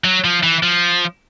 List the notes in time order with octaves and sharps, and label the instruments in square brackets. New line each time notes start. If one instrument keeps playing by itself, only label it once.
[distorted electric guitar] F#3
F3
E3
F3